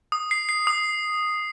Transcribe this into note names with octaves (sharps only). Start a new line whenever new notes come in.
D#6
C7
C7
D#6